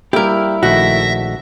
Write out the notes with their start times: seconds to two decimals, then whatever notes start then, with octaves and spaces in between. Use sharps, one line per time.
0.13 G3 A#3 E4 G4 A#4
0.63 A#1 D#3 A3 F#4 E5 A#6